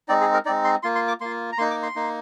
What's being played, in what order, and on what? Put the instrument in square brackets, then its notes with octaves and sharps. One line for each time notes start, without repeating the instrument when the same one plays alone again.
[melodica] G#3 C4 D#4 D5
G#4
A#4
G#3 C4 D#4 D5
C6
A#3 F4 C6
C6
D6
A#3 F4 C6
A#5
A#3 D#4 C6
D6
C6
A#3 D#4